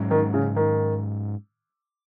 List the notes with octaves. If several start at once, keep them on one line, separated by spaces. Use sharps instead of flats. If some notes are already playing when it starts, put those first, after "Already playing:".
Already playing: G#2 F#3 C#4
D#3
C#3
D#3